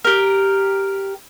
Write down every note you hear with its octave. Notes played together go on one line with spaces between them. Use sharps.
G4 A#4